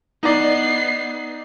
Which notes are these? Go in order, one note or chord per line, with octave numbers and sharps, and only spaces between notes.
B3 D#4 D5 C7